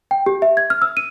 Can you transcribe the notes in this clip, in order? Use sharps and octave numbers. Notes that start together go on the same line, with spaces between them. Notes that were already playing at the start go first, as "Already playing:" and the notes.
G5
G4
E5
G#6
F6
E6
D#7